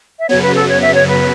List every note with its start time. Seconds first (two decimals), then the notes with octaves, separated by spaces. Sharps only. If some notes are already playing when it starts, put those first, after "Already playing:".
0.19 E5
0.29 F#2 C#3 F#3 B3 C#5
0.42 B4
0.56 A4
0.69 C#5
0.82 E5
0.95 C#5
1.08 B4